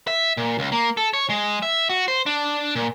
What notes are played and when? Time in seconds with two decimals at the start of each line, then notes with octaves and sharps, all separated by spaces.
0.07 E5
0.37 A#2
0.59 C#2
0.72 A#3
0.97 A4
1.13 C#5
1.30 G#3
1.62 E5
1.89 F#4
2.08 C5
2.26 D4
2.75 A#2